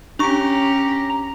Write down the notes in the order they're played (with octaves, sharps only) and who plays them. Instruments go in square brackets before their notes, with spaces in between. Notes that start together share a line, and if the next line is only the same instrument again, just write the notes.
[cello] C#4 G4 [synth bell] D4 C#6 [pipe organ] A#5